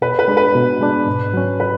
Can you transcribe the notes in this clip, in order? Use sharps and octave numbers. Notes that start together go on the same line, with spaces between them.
B2 B4
B4
G#3 D4
B4
B2
G#3 D4
G#2
F#3 C#4
B4